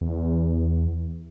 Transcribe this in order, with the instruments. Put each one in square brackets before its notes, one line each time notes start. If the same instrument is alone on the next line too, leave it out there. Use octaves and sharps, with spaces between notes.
[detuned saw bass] E2